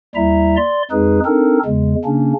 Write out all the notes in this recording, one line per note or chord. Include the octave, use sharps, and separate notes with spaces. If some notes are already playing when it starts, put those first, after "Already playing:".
D#2 G3 E4 E5 A#5
D5 C6
F2 G#3 D#4 G#4 B4
C4 D4 D#4 A4 A#4
E2 C#3 G#3
C#3 A#3 C#4 D4